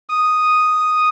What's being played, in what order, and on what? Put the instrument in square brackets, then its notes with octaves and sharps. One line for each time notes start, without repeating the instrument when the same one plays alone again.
[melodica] D#6